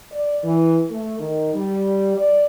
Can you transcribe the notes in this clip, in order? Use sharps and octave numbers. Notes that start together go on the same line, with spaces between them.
D5
E3
A3
D#3
G3
D5